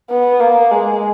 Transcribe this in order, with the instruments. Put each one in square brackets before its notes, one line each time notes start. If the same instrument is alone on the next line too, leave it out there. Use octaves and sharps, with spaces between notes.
[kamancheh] B3
A#3
G#3